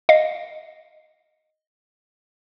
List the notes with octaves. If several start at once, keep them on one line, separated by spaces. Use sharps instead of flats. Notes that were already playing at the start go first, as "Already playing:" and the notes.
D#5 F5